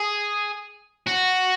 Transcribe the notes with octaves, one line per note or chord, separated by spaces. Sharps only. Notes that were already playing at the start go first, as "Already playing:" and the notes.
Already playing: G#4
F#4